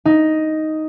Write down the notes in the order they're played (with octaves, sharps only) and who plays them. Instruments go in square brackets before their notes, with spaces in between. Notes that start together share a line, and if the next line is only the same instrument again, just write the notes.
[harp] D#4